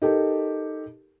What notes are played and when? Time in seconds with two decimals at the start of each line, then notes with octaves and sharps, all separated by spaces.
0.02 D#4 G4 A4 A#4